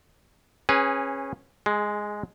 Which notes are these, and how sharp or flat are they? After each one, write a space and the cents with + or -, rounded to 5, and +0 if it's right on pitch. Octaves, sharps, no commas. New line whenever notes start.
C#4 -25 G#4 +0 B4 +0
G#3 +0 G#4 +30